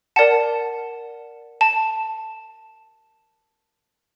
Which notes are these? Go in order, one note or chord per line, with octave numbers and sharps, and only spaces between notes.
A#4 D5 F#5 A5
A5